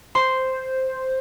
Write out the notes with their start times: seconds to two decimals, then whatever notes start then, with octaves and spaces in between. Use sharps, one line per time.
0.15 C5 C6